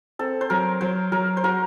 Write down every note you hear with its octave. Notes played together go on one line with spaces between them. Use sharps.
C4 A4
C5
F#3 A#4
F#3 C5
F#3 A#4
C5
F#4 A#4